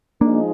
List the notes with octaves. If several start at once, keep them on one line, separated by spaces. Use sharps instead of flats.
F3 G#3 A#3 D4 D#4